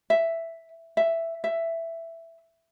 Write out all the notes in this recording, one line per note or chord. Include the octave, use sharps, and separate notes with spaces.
E5
E5
E5